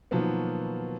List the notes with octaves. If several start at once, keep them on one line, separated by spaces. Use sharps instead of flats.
B2 D#3 F3 F#3 A#3 B3